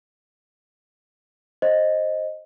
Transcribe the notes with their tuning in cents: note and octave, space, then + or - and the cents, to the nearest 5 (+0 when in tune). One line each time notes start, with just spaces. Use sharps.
C5 +10 D#5 +0